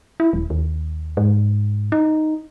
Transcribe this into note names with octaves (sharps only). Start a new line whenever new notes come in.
E4
D#1
D#2
G#2
D#4